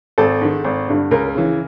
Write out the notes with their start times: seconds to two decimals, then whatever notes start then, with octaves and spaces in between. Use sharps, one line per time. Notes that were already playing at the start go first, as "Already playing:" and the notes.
0.18 G#1 A4
0.41 G#2 D#3
0.65 G#1
0.88 G2 D3
1.11 C#2 A#4
1.35 C#3 E3